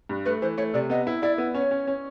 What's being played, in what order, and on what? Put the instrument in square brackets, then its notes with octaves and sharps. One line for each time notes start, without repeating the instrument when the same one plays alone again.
[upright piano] G2
[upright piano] A3 [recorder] B4
[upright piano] E3 [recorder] C5
[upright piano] A3 [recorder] C#5
[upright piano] C3 [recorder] D5
[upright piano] B3 [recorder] D#5
[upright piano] E4
[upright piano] E4 [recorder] D5
[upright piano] B3
[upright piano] C#4 [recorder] C#5
[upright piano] C#4
C#4